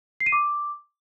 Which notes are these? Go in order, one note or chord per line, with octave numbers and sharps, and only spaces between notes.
C7
D#7
D6